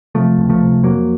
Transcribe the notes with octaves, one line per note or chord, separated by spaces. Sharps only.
C3 F3 A3
C#2
F3 A3
C3
F2 F#3 A#3